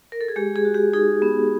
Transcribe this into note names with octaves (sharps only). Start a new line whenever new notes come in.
A#4
A4
G#4
G#3 G4
G#4
F#4
G4
D#4 G#4
B3